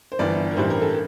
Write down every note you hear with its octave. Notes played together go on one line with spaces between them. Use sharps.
C5
G1 G2 E3 D5
A#4
A1 G2 E3 G3 C5
A#4
A4